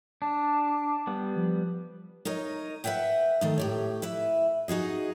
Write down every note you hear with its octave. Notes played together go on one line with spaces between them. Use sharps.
D4 A5
G3 B3
F3
D#4 A#4 C#5 D#5
B4 D5 E5 F#5 G5
D#3 A3 D#4
A2 G4 C#5
E4 B4 E5
D#4 F#4 G#4 D#5